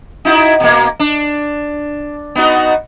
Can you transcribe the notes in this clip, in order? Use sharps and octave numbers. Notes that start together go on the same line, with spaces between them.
D#4 E4 F#4
B2 A#3
D4
B3 D#4 F#4